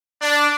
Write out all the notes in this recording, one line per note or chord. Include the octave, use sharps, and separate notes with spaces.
D4